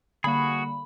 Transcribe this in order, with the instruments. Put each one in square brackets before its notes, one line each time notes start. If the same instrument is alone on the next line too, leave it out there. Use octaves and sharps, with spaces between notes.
[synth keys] D3 G3 A#3 [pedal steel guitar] F#4 G#4 [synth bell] B5